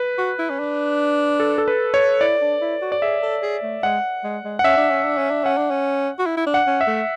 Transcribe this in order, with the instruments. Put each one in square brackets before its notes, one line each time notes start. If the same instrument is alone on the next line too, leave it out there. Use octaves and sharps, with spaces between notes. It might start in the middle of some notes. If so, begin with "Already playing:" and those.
Already playing: [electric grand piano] B4
[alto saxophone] F#4
E4
C#4
D4
[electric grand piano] A4
A4
B4
C#5
[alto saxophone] E4 [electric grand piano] D5
[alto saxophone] D4
E4
F#4
[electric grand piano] D5
[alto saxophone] G#4 [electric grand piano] E5
[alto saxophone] A4
G#4
A3
[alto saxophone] G#3 [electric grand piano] F#5
[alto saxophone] G#3
G#3
[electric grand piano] F#5
[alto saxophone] C#4 [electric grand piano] E5
[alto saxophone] D4
C#4
D4
C#4
D4
[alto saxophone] C#4 [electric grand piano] F#5
[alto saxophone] D4
C#4
F#4
E4
E4
D4
[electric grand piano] F#5
[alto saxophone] C#4
[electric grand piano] E5
[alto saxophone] A3